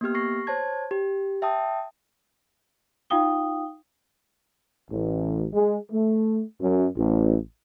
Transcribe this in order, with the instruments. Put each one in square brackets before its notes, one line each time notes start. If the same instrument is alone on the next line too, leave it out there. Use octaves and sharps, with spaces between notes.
[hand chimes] A#3 B3 G4 F6
C#6 A#6 C7
C5 C#5 A5 G#6
G4
E5 G5 A5 D#6
[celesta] D#4 F4 F5 G5 D#6 G7
[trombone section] A1
G#3
A3
F#2
A1